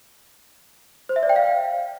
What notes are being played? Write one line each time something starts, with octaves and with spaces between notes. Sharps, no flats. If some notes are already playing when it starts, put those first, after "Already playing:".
C5
E5
D5
G5
F5